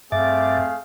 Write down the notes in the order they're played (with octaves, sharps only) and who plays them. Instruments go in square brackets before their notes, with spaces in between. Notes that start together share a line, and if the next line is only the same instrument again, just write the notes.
[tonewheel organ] G2 D6 A6 [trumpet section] A3 G#4 F5 [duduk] C4 [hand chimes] E5